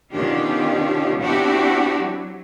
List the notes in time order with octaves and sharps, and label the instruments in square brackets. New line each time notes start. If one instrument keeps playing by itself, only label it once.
[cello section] B2 D#3 C#4 D4 F4 G4
B3 C4 D4 E4 F#4 G4
F#3